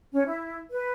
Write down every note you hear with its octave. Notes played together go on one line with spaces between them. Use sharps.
C#4
E4
B4